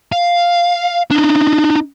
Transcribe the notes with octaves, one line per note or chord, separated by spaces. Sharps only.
F5
D4 D#4